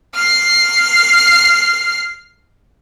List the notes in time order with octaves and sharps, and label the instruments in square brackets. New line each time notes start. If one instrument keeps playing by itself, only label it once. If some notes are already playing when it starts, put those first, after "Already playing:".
[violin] F6 C7